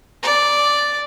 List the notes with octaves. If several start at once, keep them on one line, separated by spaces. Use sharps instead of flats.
D5